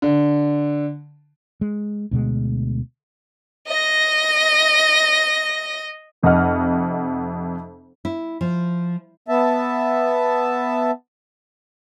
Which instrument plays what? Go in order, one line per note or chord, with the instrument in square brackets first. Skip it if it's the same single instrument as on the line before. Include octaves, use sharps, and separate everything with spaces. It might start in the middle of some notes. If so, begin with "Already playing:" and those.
[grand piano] D3
[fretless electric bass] G#3
D2 B2 G#3
[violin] D#5 A#6
[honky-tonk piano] F1 F2 C3 D#5 F#5 F6
[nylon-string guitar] E4
F3
[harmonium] B3 E5 A5